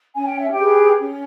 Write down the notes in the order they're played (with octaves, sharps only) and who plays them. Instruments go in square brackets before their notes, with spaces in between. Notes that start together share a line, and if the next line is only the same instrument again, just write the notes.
[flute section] C#4 G#5
G5
E5
G4 G5
G#4 B4
C#4